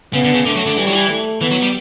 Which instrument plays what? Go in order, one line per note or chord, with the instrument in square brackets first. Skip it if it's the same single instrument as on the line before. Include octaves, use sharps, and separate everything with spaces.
[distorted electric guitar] C#3 [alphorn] B3
[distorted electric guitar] D3
C#3
[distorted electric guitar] D3 [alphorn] A3
[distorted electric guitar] F#3
D3
[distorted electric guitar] E3 [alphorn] G3
[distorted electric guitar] F#3
E3
[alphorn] A3
[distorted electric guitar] E3 [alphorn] B3
[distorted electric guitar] F#3
G3